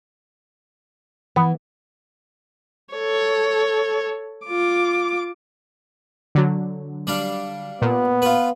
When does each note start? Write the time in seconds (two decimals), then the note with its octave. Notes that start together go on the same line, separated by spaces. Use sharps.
1.36 E3 B3
2.94 A4 C#5
4.46 F4 D6
6.35 D3 F#3
7.07 G3 D4 F5
7.82 A#2 B3
8.22 F4 B4